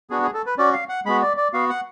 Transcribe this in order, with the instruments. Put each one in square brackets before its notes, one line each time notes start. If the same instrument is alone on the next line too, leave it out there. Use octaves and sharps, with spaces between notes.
[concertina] B3 D4 F#4 G#4
G#4
A4
B4
C#4 F#4 D5
F5
F#5
G#3 B3 F#4 B5
D5
D5
B3 F#4 F5
F#5